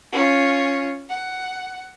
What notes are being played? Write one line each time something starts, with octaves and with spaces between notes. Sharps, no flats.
C#4 F4
F#5